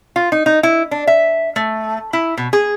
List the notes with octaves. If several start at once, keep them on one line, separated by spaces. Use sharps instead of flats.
F4
D#4
D#4
E4
D4
E5
A3
E4
B2
G#4